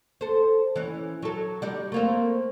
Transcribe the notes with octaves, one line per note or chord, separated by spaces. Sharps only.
A4 C5
E3 C#4
F#3 A4
G3 D4 D#4
A3 A#3 C4